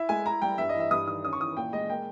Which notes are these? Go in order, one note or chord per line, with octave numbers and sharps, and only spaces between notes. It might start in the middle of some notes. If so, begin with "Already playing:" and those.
Already playing: E4 E5
G#3 G#5
E4 A#5
G3 G5
G2 E5
D#5
E3
E5
G2 D#6
D#3 D#6
C#4 D#6
C#6
E3 D#6
A#2 G5
G#3 D#5
A#3 G5